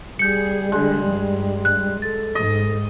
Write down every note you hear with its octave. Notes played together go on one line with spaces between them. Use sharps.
G3 G#4 G6 C#7
D3 G#3
G2
F#6
A4 A6
G#2 D#5